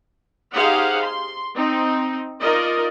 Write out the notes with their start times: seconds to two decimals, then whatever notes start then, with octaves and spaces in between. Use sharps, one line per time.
0.55 D#4 G4 G#4 C5 F5 F#5
1.03 C6
1.54 C4 D#4
2.41 D#4 F4 A#4 D5 D#5